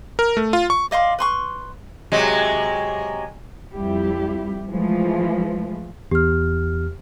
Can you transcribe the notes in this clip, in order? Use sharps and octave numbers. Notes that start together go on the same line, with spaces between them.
A#4
A3
F4
C#6
D5 D#5 F5 C6
B4 C6 C#6
C3 F#3 G#3
F2 G3 E4 G4
E3 F3 G#3 A3
E2 G4 F6